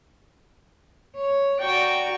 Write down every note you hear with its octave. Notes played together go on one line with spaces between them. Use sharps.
C#5
F#4 D5 G5 A#5 C#6